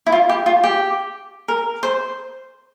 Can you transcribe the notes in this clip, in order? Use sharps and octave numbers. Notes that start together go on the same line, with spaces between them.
E4
F4
G4
F4
G4
A#4
C5